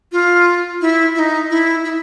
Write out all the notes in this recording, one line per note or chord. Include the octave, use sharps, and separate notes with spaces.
F4
E4
E4
D#4
E4
E4